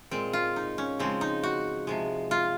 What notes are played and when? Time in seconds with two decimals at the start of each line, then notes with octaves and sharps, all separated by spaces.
0.11 A#2 G#3 C4
0.33 F4
0.56 D#4
0.78 C#4
0.99 C#3 F3 G#3 C4
1.21 D#4
1.43 F#4
1.87 C3 F3 G#3
2.31 F4